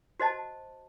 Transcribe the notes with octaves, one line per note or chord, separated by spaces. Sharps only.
F#4 C5 D#5 A5